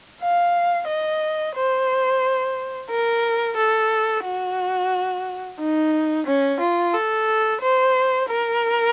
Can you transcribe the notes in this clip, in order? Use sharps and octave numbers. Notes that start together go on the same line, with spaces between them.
F5
D#5
C5
A#4
A4
F#4
D#4
C#4
F4
A4
C5
A#4